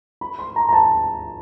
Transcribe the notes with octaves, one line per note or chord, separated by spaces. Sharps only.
B5
C6
A#5
A#5
A5